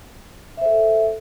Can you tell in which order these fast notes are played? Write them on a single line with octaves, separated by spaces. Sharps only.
E5 C5 A4